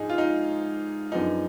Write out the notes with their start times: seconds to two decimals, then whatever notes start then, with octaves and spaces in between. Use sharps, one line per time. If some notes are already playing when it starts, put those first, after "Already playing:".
Already playing: G#2 F3 D4 D#4 G#4
0.09 F4
0.18 D#4
1.12 F#2 F3 B3 D4 D#4 G#4